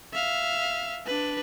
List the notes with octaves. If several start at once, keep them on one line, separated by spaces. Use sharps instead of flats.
E5 F5
D4 B4